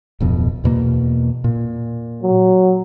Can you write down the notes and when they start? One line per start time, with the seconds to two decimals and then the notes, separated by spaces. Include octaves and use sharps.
0.20 D1 F2 B2
0.64 E2 B2 A#3
1.44 A#2
2.23 F#3